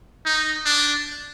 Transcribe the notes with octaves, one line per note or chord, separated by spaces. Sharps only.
D#4
D4